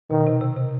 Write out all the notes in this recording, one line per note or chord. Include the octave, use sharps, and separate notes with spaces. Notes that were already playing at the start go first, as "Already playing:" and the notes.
B2 D#3
C3
C3
C3